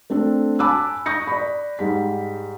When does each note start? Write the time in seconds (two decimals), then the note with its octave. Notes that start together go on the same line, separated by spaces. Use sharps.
0.10 A3 C4 D4 A4
0.59 G#5 A5 B5 D6 E6 F#6
1.06 C#6 D#6 G6 A#6 C#7
1.27 D5 B5
1.79 G#2 G3 B6